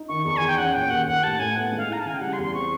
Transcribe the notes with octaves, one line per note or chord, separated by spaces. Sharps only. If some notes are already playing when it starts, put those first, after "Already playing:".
Already playing: D#4
D#3 C#6
E2 C#6
G#5
E2
G5
C#4 F#5
A#2 G5
D#2 F#5
D#2 F#5
A2 A5
A2 G#5
B3 F#5
G#2
F5
E4 A#5
A5
C#3 G#5
G5
G3 F#5
C6
E2
C6
C4 C#6